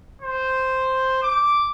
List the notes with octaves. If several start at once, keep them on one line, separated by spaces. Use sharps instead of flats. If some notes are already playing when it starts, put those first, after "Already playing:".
C5
D6